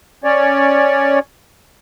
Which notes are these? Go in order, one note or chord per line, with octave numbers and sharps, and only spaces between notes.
C#4 C#5 D5